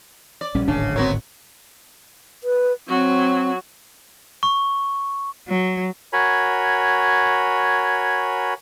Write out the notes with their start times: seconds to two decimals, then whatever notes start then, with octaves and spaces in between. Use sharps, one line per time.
0.41 D5
0.55 A#1 G3 C#4
0.68 D1 G#1 C#3 D4
0.96 F#3 B3 C4 F#4 A#4 C#5
2.44 B4
2.88 F#3 C4 F#4
4.43 C#6
5.48 F#3
6.13 F#4 A#4 C#5 G#5 B5